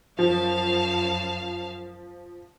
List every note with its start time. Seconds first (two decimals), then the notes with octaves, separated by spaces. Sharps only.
0.19 F#2 F3 F5 A5